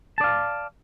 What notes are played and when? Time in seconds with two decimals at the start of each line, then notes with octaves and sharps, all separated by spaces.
0.18 A5
0.21 D5
0.24 F5